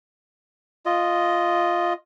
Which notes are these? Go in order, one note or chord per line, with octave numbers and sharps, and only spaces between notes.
F4 D#5